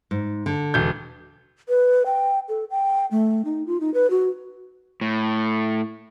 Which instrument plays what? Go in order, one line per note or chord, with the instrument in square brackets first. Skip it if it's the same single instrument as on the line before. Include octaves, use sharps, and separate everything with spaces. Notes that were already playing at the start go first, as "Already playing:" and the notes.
[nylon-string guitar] G#2
D3
[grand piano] E1 G6
[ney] B4
G5
A4
G5
A3
D#4
F4
D#4
B4
F#4
[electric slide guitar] A2